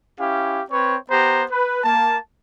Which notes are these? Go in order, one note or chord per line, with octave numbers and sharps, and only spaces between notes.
C#4 E4 G4 F5
C4 B4 C#5
B3 G4 C5 A#5
B4
A#3 A5